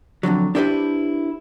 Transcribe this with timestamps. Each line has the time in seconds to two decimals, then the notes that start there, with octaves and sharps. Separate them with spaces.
0.23 F2 A2 D3 F#3
0.55 D4 E4 G4 A4 B4 C5